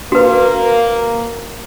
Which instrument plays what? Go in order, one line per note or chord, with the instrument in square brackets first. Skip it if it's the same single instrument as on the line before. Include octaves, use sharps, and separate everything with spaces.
[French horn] A#3 [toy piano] F#4 B4